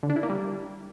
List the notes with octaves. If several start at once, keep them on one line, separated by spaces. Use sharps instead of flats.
D3
D4
E4
A#3
G3